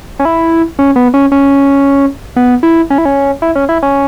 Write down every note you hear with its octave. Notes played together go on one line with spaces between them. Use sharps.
C#4
E4
C#4
B3
C#4
C#4
B3
E4
C#4
E4
C#4
E4
C#4
E4
C#4